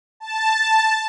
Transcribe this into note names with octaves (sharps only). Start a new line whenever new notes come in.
A5